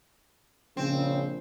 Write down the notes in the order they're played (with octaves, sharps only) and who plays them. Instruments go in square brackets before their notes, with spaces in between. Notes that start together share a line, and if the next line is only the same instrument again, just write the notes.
[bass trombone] A#1 [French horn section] C#3 [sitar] C4